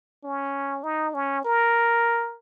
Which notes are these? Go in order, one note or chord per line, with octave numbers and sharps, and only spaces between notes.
C#4
D#4
C#4
A#4